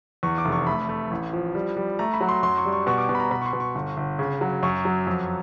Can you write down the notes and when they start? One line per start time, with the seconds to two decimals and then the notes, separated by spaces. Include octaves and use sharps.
0.23 E2 C#6
0.38 D6
0.45 F1
0.52 C#6
0.67 A3 B5
0.89 A3
1.11 A1
1.33 F3
1.55 G3
1.77 G3
1.99 A3 A#5
2.14 B5
2.21 F#3
2.29 C6
2.43 F#2 C6
2.57 C#6
2.65 G3
2.72 C#6
2.87 B2 C#6
2.98 D6
3.09 B2 C#6
3.15 B5
3.20 A#5
3.31 B2 B5
3.41 C#6
3.46 C6
3.53 B2
3.60 C#6
3.75 G1
3.97 G1
4.19 C#3
4.41 F#3
4.63 F#2 C#6
4.85 F#3
5.07 F2